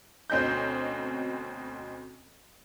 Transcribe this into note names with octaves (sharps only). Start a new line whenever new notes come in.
D2 B2 C4 C#4 D#5 G6